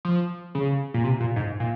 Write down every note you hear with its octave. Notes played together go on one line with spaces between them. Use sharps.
F3
C#3
A#2
C3
A#2
G#2
A#2